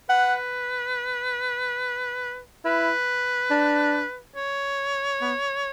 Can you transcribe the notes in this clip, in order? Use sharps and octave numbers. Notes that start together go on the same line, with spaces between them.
B4 F#5
E4 B4
D4
C#5
B3